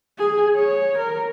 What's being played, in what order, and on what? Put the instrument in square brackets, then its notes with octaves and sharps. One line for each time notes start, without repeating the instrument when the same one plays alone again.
[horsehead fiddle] G#4
C#5
A#4